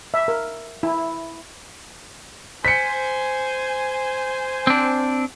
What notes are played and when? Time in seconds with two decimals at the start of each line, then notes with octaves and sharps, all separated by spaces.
0.14 E5
0.28 A#4
0.83 E4
2.65 C5 G#5 B6 C#7
4.67 C4 D4